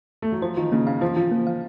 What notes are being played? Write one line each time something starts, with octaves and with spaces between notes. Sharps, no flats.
A3
F#3
F3 C5
D#3 F4
C#3 A#3
C#3 F5
F3 C5
F3 F4
A#3
F5